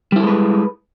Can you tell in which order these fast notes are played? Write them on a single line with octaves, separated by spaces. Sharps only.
G3 E4 A4 G#3 B4